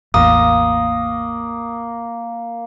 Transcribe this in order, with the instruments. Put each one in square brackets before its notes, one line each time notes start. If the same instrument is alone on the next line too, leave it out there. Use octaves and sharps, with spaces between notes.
[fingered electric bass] A1 E2 [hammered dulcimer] A#3 [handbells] D#6